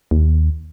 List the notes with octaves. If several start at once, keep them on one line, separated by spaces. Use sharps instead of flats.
D#2